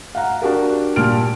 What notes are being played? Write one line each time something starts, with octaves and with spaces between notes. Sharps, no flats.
F5 F#5 A#5
D4 F#4 G4 A#4
A#2 G3 A5 F6 D7